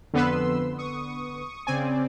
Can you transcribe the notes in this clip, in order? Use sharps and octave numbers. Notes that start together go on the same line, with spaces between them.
F2 D3 B3 B4 C6 E6
C#6 D#6
C#3 C4 D5 G#5